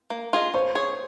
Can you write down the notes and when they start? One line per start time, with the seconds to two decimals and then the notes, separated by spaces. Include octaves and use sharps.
0.10 A#3
0.33 F4 G#4 D#5
0.54 C#4 C5
0.75 G#4 C#5